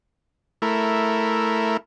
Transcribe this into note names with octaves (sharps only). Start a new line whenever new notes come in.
A3 E4 A#4